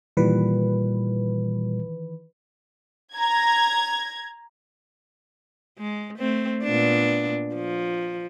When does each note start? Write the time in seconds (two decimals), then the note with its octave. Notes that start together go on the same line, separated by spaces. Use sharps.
0.17 A#2 D#3 E3 G3 B4
3.17 A#5 G#6
5.79 G#3
6.19 A3 C4
6.63 A#2 B3 D4
7.55 F3